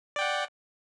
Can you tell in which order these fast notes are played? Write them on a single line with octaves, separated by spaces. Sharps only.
D5 G5 F#5